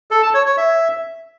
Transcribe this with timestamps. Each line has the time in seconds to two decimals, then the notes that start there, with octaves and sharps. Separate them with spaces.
0.11 A4
0.23 A5
0.34 C#5
0.46 C#5
0.57 E5